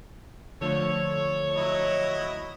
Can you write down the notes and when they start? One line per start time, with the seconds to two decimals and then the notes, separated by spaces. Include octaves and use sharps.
0.61 D3 F3 A3 A4 C#5
1.54 F#3 E4 D#5